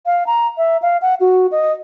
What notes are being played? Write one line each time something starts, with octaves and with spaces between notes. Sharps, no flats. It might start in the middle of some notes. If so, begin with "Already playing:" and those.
F5
A#5
E5
F5
F#5
F#4
D#5